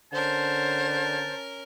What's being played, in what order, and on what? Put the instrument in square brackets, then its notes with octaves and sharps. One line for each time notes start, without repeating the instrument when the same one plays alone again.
[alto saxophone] D3 [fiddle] C#4 A#4 [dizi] C5 [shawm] A5